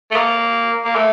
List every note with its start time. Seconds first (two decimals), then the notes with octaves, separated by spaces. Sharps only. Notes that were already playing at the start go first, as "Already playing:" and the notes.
0.11 A3
0.16 A#3
0.85 A#3
0.95 A3